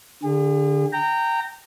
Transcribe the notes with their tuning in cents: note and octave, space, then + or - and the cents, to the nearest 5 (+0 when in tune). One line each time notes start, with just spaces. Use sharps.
D3 +0 G#4 -45
G5 -10 A#5 -20